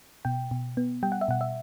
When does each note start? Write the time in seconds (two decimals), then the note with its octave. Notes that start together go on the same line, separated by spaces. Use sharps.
0.25 B2 G5
0.51 B2
0.77 B3
1.03 G3 G5
1.12 F#5
1.21 E5
1.28 B2 F#5
1.41 E5